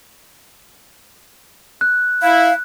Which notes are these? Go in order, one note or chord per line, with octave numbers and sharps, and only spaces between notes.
F#6
E4 F5